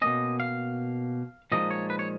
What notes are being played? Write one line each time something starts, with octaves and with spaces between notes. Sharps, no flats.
B2 A#3 C#4 D#5
F5
A#2 F3 G#3 D#4 D#5
C#5
B4
C#5